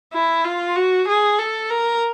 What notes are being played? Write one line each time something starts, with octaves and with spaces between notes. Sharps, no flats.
E4
F4
F#4
G#4
A4
A#4